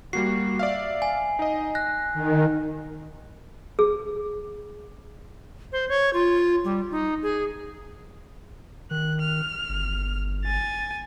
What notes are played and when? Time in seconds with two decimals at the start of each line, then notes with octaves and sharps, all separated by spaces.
0.13 G3 A#3 F#4 C7
0.59 D5 E5 F5
1.02 G#5
1.39 D#4 D#5
1.75 F#6 A#6
2.14 D#3
3.79 G#4
5.72 C5
5.89 C#5
6.13 F4
6.64 G3
6.91 D#4
7.23 G#4
8.91 D#3 F#6
9.20 F6
9.69 G1
10.45 G#5 A6